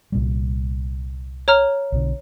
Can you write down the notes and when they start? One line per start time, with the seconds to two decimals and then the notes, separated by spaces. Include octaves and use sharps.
0.12 C2 A#2 G3
1.48 C#5 A#5 F6
1.92 B1 B2 D3